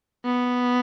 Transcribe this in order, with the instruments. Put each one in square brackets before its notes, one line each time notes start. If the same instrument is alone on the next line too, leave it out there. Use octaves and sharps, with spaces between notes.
[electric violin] B3